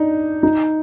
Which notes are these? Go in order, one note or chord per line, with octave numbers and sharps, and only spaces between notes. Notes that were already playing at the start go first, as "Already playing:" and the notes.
Already playing: D4 D#4
D#4